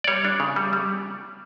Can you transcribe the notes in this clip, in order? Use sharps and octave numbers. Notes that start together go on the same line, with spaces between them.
D5
G3 C#5
D4
C#3
G3
G3